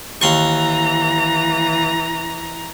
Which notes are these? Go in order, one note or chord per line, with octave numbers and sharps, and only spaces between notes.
D#2 E3 A#5 C6 C#6